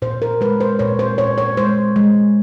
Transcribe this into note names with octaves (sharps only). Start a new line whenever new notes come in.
A#2 C5
A#4
G#3 B4
C5
A#2 C#5
C5
A#2 C#5
C#5
G#3 C5
G#3